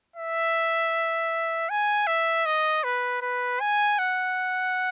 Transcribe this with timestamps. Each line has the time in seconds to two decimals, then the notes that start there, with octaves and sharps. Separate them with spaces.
0.16 E5
1.70 G#5
2.07 E5
2.46 D#5
2.84 B4
3.22 B4
3.60 G#5
3.99 F#5